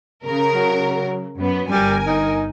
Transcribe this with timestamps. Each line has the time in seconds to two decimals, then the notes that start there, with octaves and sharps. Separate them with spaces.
0.25 C#3 A#4
0.55 F#3
1.37 F#2 B3
1.71 G1 G3 A#4 G#5
2.07 D#4